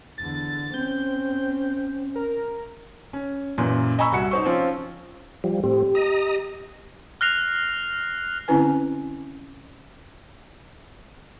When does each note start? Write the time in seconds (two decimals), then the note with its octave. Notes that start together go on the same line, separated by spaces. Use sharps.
0.18 E2 D3 A6
0.74 C4 C#4 G6
2.16 A#4
3.13 C#4
3.58 F#2 A#2 E3
3.99 D#5 G#5 A#5 B5 C#6 E6
4.12 C2 F#4 C#7
4.31 D#4 C5 C#6
4.45 F3 C4 C#4 F4
5.44 F3 G3
5.64 A2 C4 G4
5.95 D#5 A#5
7.21 F6 F#6 A#6 C7 F7
8.48 D3 C4 C#4 E4 B4 G#5